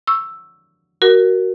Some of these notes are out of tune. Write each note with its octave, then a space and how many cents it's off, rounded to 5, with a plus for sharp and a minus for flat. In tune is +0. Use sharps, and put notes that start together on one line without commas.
C#6 +0 E6 +0
F#4 +15 A#4 +0